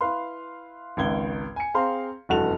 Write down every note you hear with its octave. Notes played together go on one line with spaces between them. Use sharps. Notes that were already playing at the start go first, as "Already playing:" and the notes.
E4 B4 F5 C6
G#1 C#2 G#6 G7
G#5 C#7
C4 G#4 F5 A#5 C6
F1 E2 G2 F#4 A4 F7